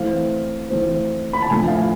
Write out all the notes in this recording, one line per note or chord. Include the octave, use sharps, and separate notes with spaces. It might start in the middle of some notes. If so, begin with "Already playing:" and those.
Already playing: E3 A3 C4 F5
E3 A3 C4
B5
A5
A2 F3 A3 D4 G#5
F5
G#5